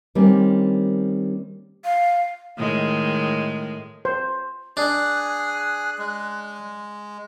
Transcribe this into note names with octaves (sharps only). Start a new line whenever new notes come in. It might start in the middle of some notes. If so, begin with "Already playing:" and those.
D#3 G3 A#3 C4 C#4
F5
A2 D#3 G#3
C5
D4 G#4 F#6
G#3